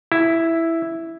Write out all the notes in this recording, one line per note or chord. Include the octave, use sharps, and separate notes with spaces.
E4